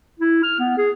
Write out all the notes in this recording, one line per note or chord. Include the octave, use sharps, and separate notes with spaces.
E4
F6
B3
G#4